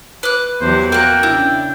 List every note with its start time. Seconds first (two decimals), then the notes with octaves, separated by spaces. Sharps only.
0.23 B4 D6 F#6
0.61 E2 F#3 G4 C5
0.92 A#3 F#4 A#4 G5 F#6
1.23 C#3 D4 E4